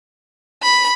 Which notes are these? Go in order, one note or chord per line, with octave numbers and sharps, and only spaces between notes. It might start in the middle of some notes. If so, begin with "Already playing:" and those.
B5